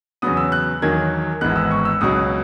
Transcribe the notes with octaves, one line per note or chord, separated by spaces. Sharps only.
E2 C#3 F#3 B3 D#6
E6
F#6
E2 D#3 F#3 A#3 G#6
G#1 G#2 E3 G#3 B3 F#6
E6
C#6
E6
C#2 B2 F#3 D#6